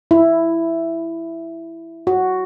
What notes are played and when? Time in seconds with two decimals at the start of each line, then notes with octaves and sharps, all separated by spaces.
0.11 E4
2.07 F#4